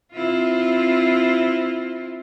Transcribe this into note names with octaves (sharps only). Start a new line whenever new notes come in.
C4 E4 F4